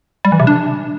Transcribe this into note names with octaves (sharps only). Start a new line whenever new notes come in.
G3
E3
C3
D4